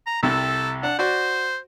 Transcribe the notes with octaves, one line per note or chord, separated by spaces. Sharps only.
A#5
C2 C3 A4
D4 F#5
F#4 C5 D5